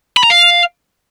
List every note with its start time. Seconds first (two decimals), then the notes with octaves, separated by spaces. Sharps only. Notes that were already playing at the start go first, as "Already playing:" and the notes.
0.17 B5
0.23 A#5
0.30 F5